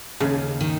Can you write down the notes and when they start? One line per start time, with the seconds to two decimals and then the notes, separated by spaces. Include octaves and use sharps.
0.20 D#2 C#3
0.61 D#3